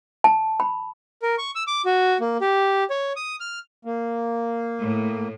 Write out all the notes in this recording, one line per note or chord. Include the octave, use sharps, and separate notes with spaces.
A5
B5
A#4
C#6
E6
D6
F#4
A#3
G4
C#5
D#6
F6
A#3
A2